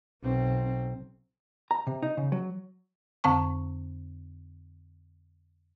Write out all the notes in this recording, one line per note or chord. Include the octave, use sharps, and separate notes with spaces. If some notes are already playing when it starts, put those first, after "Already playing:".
B1 C4
A#5
C3
D#4
C#3
F#3
F2 D3 C4 A5 C#6